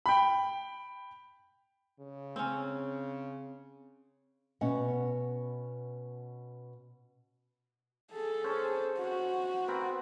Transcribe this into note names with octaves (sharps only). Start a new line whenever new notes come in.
G5 B5
C#3
C4 C#4
B2 C#4 F#5
G#4 A4
C#4 C5
F#4
B3 C4 A#4